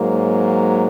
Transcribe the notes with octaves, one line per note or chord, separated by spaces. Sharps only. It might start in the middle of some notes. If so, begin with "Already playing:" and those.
Already playing: G#2 F#3 A#3